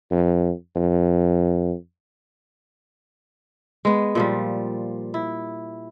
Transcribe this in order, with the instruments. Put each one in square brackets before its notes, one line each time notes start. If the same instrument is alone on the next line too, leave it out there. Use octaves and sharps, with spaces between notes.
[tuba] F2
F2
[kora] G#3 B3
A#2 F3 G3
E4